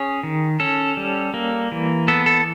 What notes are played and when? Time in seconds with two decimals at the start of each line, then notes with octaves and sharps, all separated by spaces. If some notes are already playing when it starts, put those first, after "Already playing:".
Already playing: C#4 G#4
0.23 D#3
0.60 C#4 A4
0.97 G3
1.34 A#3
1.72 E3
2.08 B3 A4
2.26 A4